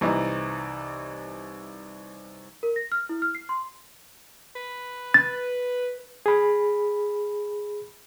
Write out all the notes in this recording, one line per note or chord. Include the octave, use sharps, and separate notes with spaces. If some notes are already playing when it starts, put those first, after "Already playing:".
C2 E3 D#4
A#4
A#6
F6
E4
F6
C7
C6
B4
A6
G#4 B5